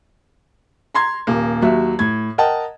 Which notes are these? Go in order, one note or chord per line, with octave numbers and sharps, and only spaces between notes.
A#5 C6 G#6
D#1 A#3
D#2 F#3 E5
A2 G#6
A#4 D#5 F#5 G5 A5